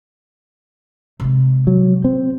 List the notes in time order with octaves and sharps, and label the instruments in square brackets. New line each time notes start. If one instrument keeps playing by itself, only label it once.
[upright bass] C3 G#3
[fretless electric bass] F#3
C4